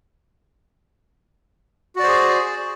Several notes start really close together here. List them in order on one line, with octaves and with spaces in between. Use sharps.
F#4 D5 C5 G#4